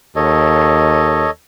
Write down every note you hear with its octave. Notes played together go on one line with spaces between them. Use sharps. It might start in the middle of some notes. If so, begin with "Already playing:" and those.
D#2 A4 C#5 D#5